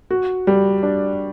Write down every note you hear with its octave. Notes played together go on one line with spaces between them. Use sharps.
F#4
G3
D4